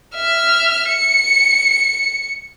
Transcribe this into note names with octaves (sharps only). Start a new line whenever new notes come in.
E5 F6
C#7